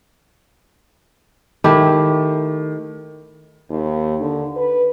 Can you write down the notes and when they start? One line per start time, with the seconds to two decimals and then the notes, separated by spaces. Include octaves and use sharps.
1.64 D#3 A3 E4 G4
3.70 D#2
4.20 D3
4.56 B4